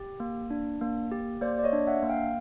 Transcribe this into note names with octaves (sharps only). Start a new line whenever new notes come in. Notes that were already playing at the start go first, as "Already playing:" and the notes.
Already playing: G4
A#3
D4
A#3
G4
A#3 C5 D5
D5
C#5 D#5
D4
E5 F#5
A#3
F5 G5